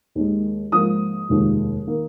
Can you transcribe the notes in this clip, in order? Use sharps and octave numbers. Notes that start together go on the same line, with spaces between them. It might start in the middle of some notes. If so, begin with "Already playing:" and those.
D#2 D#3 G#3
G#2 F3 A#3 F4 D#6
F1 D#2 D#3 G#3 F4
D#3 A#3